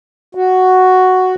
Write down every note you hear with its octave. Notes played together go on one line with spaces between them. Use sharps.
F#4